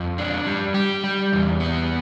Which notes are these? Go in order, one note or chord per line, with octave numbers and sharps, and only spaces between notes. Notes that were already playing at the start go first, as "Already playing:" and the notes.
Already playing: F2
D4
G3
G4
G3
E2
B3